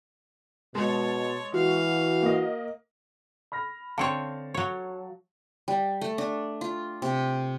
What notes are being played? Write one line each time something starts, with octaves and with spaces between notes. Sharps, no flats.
B2 G#3 C#5 A5
E3 F#4 F5
A#3 D#5
B5 F6 A#6
D3 C4 C#5 F5 A5 C#7
F#3 C#5
G3
A3
D4
F4
C3